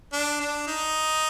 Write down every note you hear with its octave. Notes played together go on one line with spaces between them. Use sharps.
D4
D4
D#4